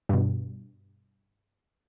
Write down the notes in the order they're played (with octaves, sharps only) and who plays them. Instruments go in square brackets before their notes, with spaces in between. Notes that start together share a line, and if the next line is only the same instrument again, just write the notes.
[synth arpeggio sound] G2 B2